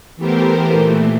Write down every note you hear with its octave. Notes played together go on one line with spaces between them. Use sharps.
E3 A3 B3 G4 A#4 C5
A#2 E3 A3